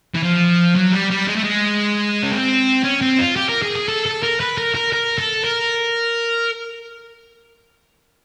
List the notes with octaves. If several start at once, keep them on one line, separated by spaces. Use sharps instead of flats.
E3
F3
F#3
G3
G3
G#3
A3
G#3
C#4
C4
C#4
C4
F4
G4
A#4
G#4
G#4
A4
A4
A#4
B4
A#4
A#4
A#4
A4
A#4